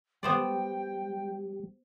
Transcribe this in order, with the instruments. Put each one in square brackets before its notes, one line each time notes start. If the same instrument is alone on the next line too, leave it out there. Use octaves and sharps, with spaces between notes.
[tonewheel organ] G3 [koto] B3 C5 D5 [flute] G5